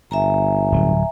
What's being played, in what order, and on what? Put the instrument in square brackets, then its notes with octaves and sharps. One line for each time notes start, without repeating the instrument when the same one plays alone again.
[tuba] G1 [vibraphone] E5 G#5 A#5
[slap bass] D1 F#3